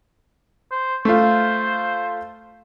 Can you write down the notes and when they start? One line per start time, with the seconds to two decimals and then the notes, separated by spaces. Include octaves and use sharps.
0.71 C5
1.05 A3 F4 C5